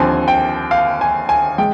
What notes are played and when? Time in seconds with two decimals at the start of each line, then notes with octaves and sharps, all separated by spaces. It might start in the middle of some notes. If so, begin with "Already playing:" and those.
Already playing: D#2 D3 F3 C4 G#5
0.28 G5
0.71 F5
1.01 G#5
1.29 G#5
1.58 G#3 G5